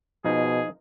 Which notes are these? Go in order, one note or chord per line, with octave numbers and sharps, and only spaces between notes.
B2 F3 D#4 G#4